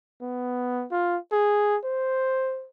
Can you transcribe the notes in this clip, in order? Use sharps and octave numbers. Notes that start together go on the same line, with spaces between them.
B3
F4
G#4
C5